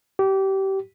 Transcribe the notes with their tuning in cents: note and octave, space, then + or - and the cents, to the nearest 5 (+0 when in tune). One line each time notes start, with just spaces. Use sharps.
G4 -25